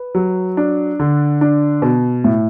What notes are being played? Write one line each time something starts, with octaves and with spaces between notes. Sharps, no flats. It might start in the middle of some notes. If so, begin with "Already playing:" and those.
Already playing: B4
F#3
D4
D3
D4
B2
A2